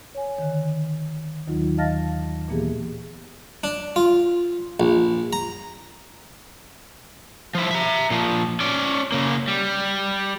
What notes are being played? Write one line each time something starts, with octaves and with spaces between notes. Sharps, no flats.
C#5 G#5
D3 D#3
D#2 D#3 F#3 D#4 F4
D#5 F5 A5 F6 A6 A#6
A#2 E3 A#3 B3 G4 G#4
D4
F4
A#1
A#5
F3 E4
E5 A#5
A#2 F3
C#4 D5
C#3 A#3
G3